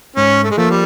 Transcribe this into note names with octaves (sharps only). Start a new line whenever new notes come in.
G#2 C#4
A3
G#3
F3 A3 A#3
G3